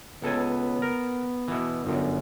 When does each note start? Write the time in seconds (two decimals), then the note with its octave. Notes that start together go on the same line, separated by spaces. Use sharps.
0.22 C#2 B3 A4 G#5
0.82 A#4
1.48 B2 E3
1.85 G1 F#2